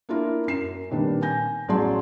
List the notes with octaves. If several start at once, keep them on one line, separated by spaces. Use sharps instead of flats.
A#3 D4 E4 F4 A#4
F#2 C7 E7
A#2 D#3 G3 C4 D4 B4
G#5 G6 A#6
A1 F#3 G#4 D5 A5 C6